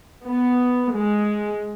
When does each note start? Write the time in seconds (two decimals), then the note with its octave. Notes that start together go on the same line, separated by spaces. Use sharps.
0.26 B3
0.92 G#3